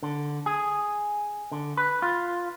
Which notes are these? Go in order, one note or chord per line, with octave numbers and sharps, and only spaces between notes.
D3
G#4
D3
B4
F4